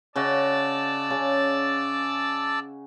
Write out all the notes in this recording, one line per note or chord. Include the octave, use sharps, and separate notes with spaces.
C#3 F#4 D5 D#5 A5 E6
C#3 G#5